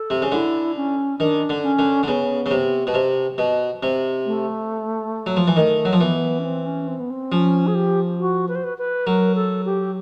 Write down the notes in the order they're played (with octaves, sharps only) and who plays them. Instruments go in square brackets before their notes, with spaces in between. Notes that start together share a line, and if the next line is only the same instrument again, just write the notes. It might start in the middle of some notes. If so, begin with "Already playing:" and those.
Already playing: [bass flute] A4
[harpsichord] C3
C#3
[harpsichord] D3 [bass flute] E4
[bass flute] C#4
[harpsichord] D#3 [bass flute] D4
[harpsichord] D3
[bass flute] C#4
[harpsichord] D3
D3
[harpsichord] C#3 [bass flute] B3
[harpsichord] C#3
C3
B2
C3
B2
C3
[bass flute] A3
[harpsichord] F#3
F3
E3
[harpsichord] D#3 [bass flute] A3
[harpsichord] F#3
F3
[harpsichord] E3 [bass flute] B3
[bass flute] C#4
C4
C#4
C4
B3
C4
[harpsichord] F3 [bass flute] C#4
[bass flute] G#4
G4
F#4
B4
C5
B4
B4
[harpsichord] F#3 [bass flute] A#4
[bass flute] A4
G4